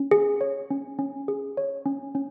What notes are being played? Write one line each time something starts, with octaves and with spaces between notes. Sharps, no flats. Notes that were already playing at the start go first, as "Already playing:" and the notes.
Already playing: C#4
G#4
C#5
C#4
C#4
G#4
C#5
C#4
C#4